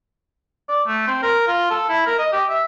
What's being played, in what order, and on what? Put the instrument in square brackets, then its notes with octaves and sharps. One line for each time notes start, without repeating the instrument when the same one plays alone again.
[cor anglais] D5
A3
C4
A#4
F4
A4
E4
A#4
D#5
G4
E5